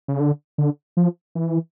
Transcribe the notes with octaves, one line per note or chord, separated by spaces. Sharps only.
C#3
D3
D3
F3
E3